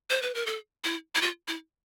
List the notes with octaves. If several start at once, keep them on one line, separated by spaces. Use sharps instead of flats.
C5
B4
A#4
A4
E4
E4
F4
E4